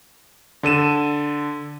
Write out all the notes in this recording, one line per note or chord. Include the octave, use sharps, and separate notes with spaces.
D3 A4 D#7 E7